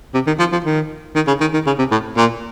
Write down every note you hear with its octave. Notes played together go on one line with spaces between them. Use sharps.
C3
D#3
F3
F3
D#3
D#3
C#3
D#3
D#3
C#3
C3
A2
A#2